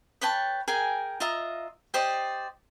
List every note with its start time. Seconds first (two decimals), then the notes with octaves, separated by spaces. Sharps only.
0.21 B4 C#5 G5 A5
0.68 G#4 A#4 G5 G#5
1.20 F4 D#5 E5 A#5
1.94 G4 C5 D5 D#5